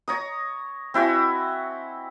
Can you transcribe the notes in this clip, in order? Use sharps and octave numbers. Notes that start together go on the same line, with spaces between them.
C#5 A#5 D#6
C4 E4 F#4 G#5